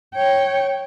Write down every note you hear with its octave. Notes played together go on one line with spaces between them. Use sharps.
C#5 G5